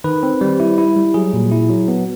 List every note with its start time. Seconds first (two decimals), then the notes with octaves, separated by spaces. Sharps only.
0.04 D#3 B4
0.23 C4
0.41 G3
0.60 E4
0.78 E4
0.96 G3
1.14 F#3 G#4
1.34 A#2
1.51 E4
1.70 F#3
1.88 B3